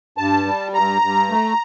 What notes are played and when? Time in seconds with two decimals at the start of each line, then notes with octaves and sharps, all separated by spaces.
0.18 G2 A5
0.46 G3
0.74 G2 A#5
1.02 G2
1.30 A3